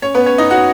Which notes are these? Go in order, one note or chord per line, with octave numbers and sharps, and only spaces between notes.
C#4 C#5
B3 B4
C#4 C#5
D#4 D#5
F#4 F#5